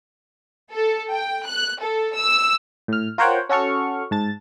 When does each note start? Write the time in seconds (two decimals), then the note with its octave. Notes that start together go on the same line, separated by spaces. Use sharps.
0.74 A4
1.12 G5
1.47 F#6
1.82 A4
2.17 E6
2.88 A2 F6
3.18 F4 A#4 C5 C#5 F#5 G5
3.49 C#4 F#4 A4 C#6 F6
4.11 G#2 A5 A6